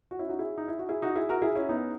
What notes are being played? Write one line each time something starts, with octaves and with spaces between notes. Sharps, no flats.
F#4
C#4 E4
D#4 F#4
E4 G#4
D#4
E4
F#4
E4 G#4
D#4 F#4
E4 G#4
F#4 A#4
E4 G#4
C#4 E4
B3 D#4